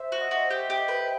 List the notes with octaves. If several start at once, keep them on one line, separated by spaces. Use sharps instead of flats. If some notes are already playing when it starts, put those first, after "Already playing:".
Already playing: C5 E5
F#4
D#5
F#4
G4
G4
B4